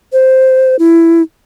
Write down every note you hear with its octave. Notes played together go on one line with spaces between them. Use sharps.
C5
E4